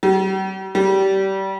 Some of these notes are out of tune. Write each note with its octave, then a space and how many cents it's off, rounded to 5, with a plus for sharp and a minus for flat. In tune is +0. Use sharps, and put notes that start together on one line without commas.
G3 -45
G3 -25